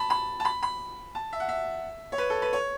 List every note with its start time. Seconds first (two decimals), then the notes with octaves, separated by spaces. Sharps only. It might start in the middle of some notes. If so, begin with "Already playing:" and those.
Already playing: A5 B5
0.10 B5
0.40 A5
0.45 B5
0.63 B5
1.15 A5
1.33 E5
1.40 F#5
1.49 E5
2.12 C#5
2.18 B4
2.30 A4
2.42 B4
2.53 C#5